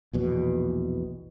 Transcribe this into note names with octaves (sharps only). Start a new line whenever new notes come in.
A#1 E2 B2